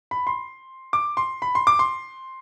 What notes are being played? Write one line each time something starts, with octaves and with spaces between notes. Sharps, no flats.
B5
C6
D6
C6
B5
C6
D6
C6